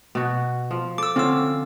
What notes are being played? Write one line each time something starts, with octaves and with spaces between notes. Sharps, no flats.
B2 F#4
F3
A4 D6 E6
D3 C4 C#4 F4 E6